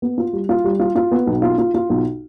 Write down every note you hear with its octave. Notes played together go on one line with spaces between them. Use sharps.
B3
F4
G3
F4
G3
F4
F4
B3
B1
F4
F4
F4
B1